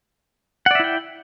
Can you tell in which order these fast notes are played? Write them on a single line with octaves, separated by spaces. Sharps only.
F#5 D5 E5 E4 G5